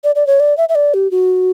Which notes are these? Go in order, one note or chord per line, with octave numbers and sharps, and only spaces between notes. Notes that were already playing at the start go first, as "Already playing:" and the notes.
D5
D5
C#5
D5
E5
E5
D5
G4
F#4